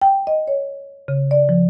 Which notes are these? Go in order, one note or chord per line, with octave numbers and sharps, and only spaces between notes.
G5
D#5
C#5
C#3
D5
F3